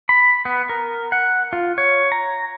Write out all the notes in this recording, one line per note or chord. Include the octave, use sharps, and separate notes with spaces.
B5
B3
A#4
F#5
F4
C#5
A#5